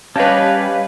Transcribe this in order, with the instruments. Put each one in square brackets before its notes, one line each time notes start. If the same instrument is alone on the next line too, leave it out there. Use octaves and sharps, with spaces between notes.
[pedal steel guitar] G3 C#4 [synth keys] G4 B4 [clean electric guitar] C#5 D#5 A5 [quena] F5